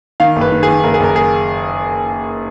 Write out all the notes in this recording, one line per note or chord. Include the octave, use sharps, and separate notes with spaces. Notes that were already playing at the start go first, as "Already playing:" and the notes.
D#3 F5
F#1
B4
D#3
D#3 G#4
F#1 A#4
G#4
F#1 A#4
G#4